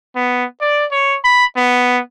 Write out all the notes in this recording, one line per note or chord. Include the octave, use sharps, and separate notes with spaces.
B3
D5
C#5
B5
B3